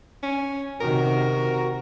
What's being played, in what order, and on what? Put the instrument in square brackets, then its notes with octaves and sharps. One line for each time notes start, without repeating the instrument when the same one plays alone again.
[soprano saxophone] C#4
[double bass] C3 D#3 [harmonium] F#4 [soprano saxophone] A#4